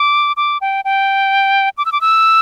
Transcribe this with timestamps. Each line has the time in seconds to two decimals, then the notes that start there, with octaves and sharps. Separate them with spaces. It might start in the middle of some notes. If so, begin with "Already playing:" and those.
Already playing: D6
0.37 D6
0.61 G5
0.85 G5
1.78 D6
1.86 E6
1.92 D6
2.01 E6